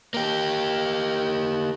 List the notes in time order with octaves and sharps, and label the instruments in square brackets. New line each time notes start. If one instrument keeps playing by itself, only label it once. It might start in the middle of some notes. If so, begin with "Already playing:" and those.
[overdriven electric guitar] A#3 G4